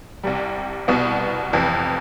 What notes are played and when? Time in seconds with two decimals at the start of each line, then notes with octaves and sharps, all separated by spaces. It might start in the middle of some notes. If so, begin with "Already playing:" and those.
0.23 C2 C3 G3
0.88 C2 B2 B3
1.53 F1 F2 E3